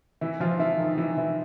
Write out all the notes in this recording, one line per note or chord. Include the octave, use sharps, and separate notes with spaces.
E3 E4
F3 F4
E3 E4
D#3 D#4
E3 E4
E3 E4